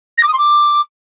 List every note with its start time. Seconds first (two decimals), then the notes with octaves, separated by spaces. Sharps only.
0.17 A#6
0.23 D6
0.28 D#6
0.33 C6
0.38 D6